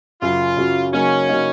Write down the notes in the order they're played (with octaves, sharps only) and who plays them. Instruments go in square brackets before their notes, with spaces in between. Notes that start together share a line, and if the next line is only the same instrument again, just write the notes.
[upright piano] F#2 C#3 F#3 [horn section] F4
[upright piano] F#2 C#3 F#3
[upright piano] C#3 F#3 A#3 D#4 [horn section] C#4
[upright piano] C#3 F#3 A#3 D#4